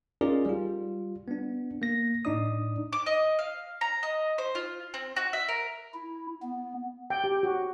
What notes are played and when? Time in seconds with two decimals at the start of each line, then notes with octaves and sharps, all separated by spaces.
0.21 C#4 D#4 F4 G#4 A#4 D5
0.46 G3 F4
1.28 B3 D4
1.82 A#3 A#6
2.25 A2 D4 D#4 D5 D#6
2.93 D6
3.06 D#5
3.39 F5
3.81 A#5
4.03 D#5
4.38 C5
4.55 F4
4.94 C4
5.16 F#4
5.33 E5
5.48 A#4
5.94 E4
6.42 B3
7.10 G5
7.24 G4
7.43 F#4